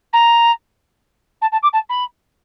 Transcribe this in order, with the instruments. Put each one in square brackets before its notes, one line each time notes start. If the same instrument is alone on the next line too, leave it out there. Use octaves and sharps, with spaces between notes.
[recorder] A#5
A5
A5
D6
A5
B5